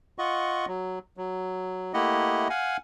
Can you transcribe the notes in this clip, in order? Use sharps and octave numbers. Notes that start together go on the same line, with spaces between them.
F4 D#5 F#5 C#6
F#3
F#3
A3 A#3 E4 G4 D#5 F#5
F5 F#5 G#5